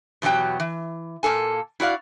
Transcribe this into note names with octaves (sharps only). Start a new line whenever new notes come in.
E2 B2 F#3 G4 G5
E3
A#2 A#3 A4 G#5
E4 F#4 D5 F5